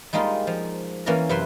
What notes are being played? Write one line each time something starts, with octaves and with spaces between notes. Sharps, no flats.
G3 G#3 A#3 D#4 F4
F3
E3 A#3 C#4 A#4 D5 A#5
F#2 C3 B4 E5 C6